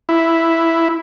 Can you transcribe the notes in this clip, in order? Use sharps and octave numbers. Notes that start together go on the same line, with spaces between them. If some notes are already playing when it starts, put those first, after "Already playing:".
E4